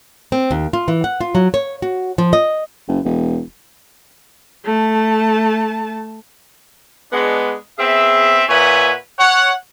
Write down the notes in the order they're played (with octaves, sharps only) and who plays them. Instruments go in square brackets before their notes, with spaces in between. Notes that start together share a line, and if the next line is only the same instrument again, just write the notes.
[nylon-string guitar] C4
D#2
F4
E3
F#5
F4
F#3
C#5
F#4
F3
D#5
[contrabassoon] F#1
E1
[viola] A3 A5
[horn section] G#3 B3 D4
B3 C4 G#4 E5
A#2 B4 C#5 E5 F#5 G#5
C#5 F#5